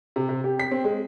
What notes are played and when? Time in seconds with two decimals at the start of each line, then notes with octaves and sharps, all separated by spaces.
0.16 C3
0.29 C3
0.44 G4
0.59 B6
0.71 C4
0.84 G#3